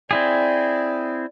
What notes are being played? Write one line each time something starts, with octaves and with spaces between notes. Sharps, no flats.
C4 E4 G#4 D5